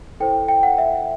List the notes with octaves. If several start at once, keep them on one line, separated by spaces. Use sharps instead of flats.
E4 A4 C5 G5
G5
F#5
E5